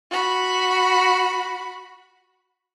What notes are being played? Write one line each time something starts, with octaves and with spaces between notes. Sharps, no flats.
F#4 B5